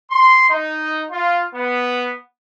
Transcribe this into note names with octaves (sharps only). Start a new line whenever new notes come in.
C6
D#4
F4
B3